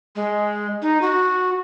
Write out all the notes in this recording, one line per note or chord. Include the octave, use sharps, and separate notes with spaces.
G#3
D#4
F#4